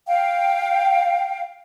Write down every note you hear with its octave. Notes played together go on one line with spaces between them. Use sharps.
F5 G5